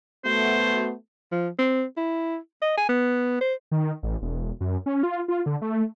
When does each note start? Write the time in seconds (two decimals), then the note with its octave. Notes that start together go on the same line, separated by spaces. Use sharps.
0.24 A3 B3 F#4 C5
1.32 F3
1.59 C4
1.97 E4
2.62 D#5
2.77 G#5
2.89 B3
3.41 C5
3.71 D#3
4.03 A1
4.22 E1
4.61 F#2
4.86 C#4
5.03 F4
5.28 F4
5.46 D3
5.61 A3